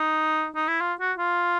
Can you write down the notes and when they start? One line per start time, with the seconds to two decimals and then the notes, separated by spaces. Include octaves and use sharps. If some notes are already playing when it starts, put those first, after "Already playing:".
Already playing: D#4
0.56 D#4
0.68 E4
0.81 F4
1.00 F#4
1.18 F4